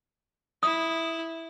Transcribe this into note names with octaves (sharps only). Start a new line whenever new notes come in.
E4 D#6